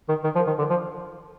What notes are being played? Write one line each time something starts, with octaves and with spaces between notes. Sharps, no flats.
D#3
D#3
F3
D#3
D3
F3